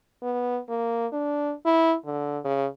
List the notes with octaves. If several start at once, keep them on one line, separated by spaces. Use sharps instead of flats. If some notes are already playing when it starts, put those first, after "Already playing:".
B3
A#3
D4
E4
D3
C#3